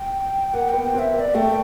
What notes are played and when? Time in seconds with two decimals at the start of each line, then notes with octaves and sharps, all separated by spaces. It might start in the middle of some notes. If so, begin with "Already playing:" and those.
Already playing: G5
0.53 A#3 F#5
0.68 G5
0.73 B3
0.83 G5
0.94 C4
0.99 E5
1.14 A#3 E5
1.19 D5
1.35 A3 G5